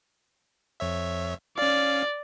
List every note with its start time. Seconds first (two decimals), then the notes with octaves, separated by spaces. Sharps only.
0.80 F2 C#5 E5
1.58 C#4 D5 F5